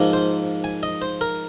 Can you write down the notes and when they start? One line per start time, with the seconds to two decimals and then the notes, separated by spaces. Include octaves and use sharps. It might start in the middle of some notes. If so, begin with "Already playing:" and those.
Already playing: G#2 F3 A#3
0.13 C5
0.64 G#5
0.83 D#5
1.02 C5
1.21 A#4